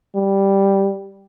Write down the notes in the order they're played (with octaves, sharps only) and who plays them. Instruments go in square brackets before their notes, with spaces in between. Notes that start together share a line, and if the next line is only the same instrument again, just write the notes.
[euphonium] G3